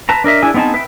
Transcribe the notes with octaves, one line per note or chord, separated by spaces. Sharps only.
B4 A5 A#5
D4 A#4 D#5 E5
D4 E4 G#4 G#5
B3 C4 D#4 G#4 A5
B4 E5 G5